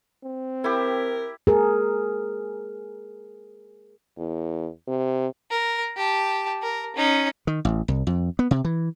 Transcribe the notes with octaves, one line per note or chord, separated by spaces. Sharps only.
C4
E4 G4 A#4
G#4 A#4
E2
C3
A#4
G4 A5
A#4
C#4 D#4
D#3
A1
C2
F2
B3
C3
E3